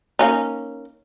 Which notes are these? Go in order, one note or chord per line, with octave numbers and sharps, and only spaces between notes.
A#3 C#4 D#4